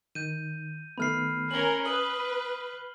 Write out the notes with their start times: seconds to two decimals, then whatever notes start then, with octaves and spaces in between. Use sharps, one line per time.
0.15 D#3 G6 D#7
0.98 D#3 A3 B3 B5 F6 C7
1.51 C#4 A#4 F#7 G7
1.86 B4 D#6 F#7